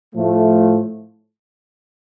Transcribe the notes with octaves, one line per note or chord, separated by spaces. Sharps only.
A2 F3 A3